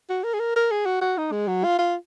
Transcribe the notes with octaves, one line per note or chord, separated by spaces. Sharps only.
F#4
A#4
G#4
A#4
A#4
G#4
F#4
F#4
D#4
G#3
F#3
F4
F4